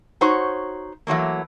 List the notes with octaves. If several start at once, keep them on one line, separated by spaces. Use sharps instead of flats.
D#4 F#4 C5 C#5
E3 F#3 A3 A#3